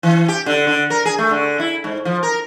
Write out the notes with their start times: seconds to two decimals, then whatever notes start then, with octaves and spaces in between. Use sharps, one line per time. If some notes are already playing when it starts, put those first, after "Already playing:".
0.03 E3
0.28 G4
0.46 D3
0.67 D3
0.90 A#4
1.05 G#4
1.18 A3
1.31 D3
1.60 E4
1.84 G#2
2.05 F3
2.23 A#4